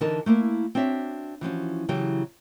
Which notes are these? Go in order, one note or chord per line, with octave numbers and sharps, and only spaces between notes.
D3 E3 D#4 A4 A#4 A5
A3 A#3 E4 A#4
C4 D4 F#4 C#5 E5
E3 F3 C#4 F#4
C#3 E3 F#3 E4 G4